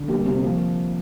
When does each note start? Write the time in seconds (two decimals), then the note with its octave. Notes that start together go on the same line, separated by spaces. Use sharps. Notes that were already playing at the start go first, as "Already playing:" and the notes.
Already playing: D3
0.08 G3 A#3
0.25 C3 C4
0.38 C4
0.43 F3 A#3